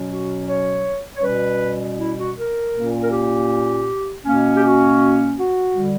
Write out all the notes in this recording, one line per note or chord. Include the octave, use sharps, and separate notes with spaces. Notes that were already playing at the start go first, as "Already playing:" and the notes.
Already playing: B2 F#3 C#4
F#4
C#5
C#5
B2 G3 C#4 B4
E4
F#4
A#4
A#2 A#3 C#4
A#4
G4
B2 A#3 C#4
G4
F#4
F#4
D3 G3